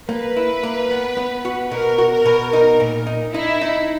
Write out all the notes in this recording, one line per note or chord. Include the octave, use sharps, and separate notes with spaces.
A#3 B4
E4
A#3
B3
B3
F#4
B2 A#4
F#4
A#4
B2
D#4 A#4
A#2
D#4
D#4 E4
D#4